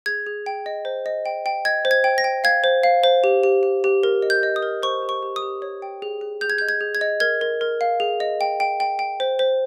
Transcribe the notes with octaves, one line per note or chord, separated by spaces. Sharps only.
G#4 G#6
G#4
G5
D#5
C5
D#5
G5
G5
D#5 G#6
C5
G#6
G5
A#6
G5
F5 G#6
C5
F5
C5
G4
G4
G4
G4
A#4
D#5
G6
D#5
D#6
A#4
C5 C#6
G4
C#6
G4
D#6
G4
C#5
G5
G#4
G#4
G#4 G6
G#6
G6
D#5
G#6
G#4
G#6
D#5
A#4 G#6
A#4
A#4
F5
G#4
D#5
G5
G5
G5
G5
C5
C5